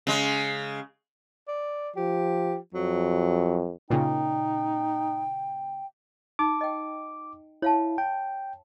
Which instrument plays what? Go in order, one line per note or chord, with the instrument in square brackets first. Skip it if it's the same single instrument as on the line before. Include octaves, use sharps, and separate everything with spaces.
[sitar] C#3 G#3
[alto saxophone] D5
[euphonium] F3 [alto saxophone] G4
[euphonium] F2 [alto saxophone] F#3
[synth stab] A#2 C#3 [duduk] D#4 [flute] G5
[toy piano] D#4 [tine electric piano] D6
[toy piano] D#5 G5
[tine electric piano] E4 [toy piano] C#5 F5 A5
[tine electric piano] G5